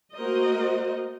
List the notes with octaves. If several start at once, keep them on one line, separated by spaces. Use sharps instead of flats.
A3 A#3 F#4 A#4 C5 D#5